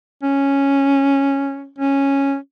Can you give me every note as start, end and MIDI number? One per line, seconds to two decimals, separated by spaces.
0.23 1.70 61
1.79 2.36 61